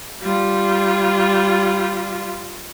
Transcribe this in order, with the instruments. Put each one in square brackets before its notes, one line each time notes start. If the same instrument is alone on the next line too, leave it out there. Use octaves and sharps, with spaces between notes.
[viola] G3 F4